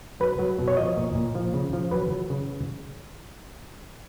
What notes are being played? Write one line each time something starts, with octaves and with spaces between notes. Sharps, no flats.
F#3 B4
F#3
B2
C#5
F3 D#5
A#2
A#2
F3
C#3
F3
F#3 B4
F#3
C#3